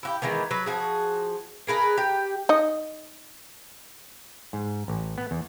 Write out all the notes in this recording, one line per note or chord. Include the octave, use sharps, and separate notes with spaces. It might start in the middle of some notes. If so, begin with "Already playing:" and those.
E4 F#4 G4
D#3 E3 G#3 B3
F#3 B4
F3 F#4 G#4
G#4 A#4 B4 D#5
G4
D#4 D#5
G#2
A1
B3
E2